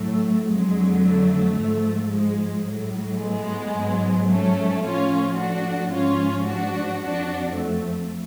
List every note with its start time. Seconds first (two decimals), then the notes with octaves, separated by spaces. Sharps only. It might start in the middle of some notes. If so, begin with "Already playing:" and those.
Already playing: A2 F#3 A3
0.49 F2 D3 F#3 G#3
1.03 A3
1.57 G#2 F3
2.13 G#3
2.67 A2 F#3
3.21 G#3 B3
3.76 G#2 F#3
4.30 A3 C#4
4.84 A2 F3 C#4 F4
5.39 D4 F#4
5.93 G#2 F3 C#4 F4
6.48 D4 F#4
7.02 F2 F3 D4 F#4
7.57 A3